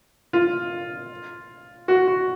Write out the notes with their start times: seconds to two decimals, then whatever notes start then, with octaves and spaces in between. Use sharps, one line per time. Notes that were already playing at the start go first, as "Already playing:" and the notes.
0.33 F4
1.88 F#4
2.08 F#4